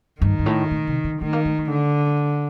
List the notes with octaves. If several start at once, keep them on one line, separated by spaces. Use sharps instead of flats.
G2 D#3
G2
A2
A#2
C3
D3
D#3 A3
A#3
A3
A3
D3